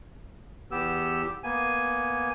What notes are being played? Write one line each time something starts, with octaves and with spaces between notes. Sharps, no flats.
E2 B3 G4 E6
A#3 B3 G#5